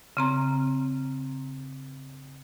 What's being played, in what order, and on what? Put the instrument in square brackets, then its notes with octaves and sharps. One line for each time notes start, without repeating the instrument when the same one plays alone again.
[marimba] C#3 C4 A#5